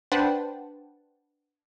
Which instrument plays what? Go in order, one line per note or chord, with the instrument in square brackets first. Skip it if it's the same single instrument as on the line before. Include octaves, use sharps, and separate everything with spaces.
[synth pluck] D4 B4 C5 F#5 G5 A5